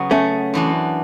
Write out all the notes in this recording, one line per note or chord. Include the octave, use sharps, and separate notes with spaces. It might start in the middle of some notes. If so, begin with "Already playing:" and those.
Already playing: C#3 F#3 B3
A3 C#4
F#2 E3 B3 D4 F#4